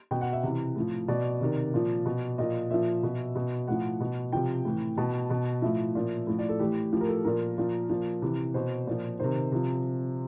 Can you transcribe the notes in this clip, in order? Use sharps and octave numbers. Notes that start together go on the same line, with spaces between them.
B2 G5
F#5
E5
C3 E3
A2 F3
B2 D5
C3 D#3
A#2 F3
B2
A#2 F3 D#5
A#2 F3 E5
B2
B2
A2 F3 F#5
B2
C3 F3 G5
A2 E3
B2 A5
B2
A2 F3 E5
A#2 F3
A2 F3
D5
A4
A2 E3 G4
A2 F3 G4
A#4
A4
A#2 F3 A#4
A#2 F3
A#2 F3
C3 E3
B2 C5
A#2 F3
C3 D#3 C5
C3 F3